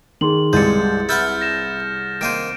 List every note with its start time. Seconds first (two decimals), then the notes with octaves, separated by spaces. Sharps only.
0.21 D#3 G#4 C6 F#7
0.53 C2 G2 G#3 G6 A6 C#7
1.09 E4 B4 F#5 F6 G6 A6
1.41 A#6 E7
2.21 D#3 A#3 C5 D7 D#7